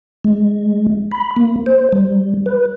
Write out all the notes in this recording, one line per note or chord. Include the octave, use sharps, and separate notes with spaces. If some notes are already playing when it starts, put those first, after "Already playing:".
G#3
B5
A#3
C5
G3
B4